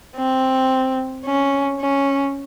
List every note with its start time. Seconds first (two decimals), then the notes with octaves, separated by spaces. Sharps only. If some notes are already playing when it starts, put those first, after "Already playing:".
0.17 C4
1.26 C#4
1.80 C#4